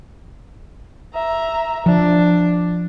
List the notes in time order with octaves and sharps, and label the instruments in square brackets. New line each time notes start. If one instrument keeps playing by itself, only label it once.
[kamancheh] E5 A#5
[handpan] F3 [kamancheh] D4